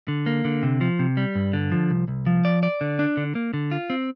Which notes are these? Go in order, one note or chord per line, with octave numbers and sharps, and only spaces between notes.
D3
A#3
D3
C3
F3
C3
G3
G2
D3
F3
C2
C2
F3
D5
D5
D3
D4
D3
A#3
D3
F4
C4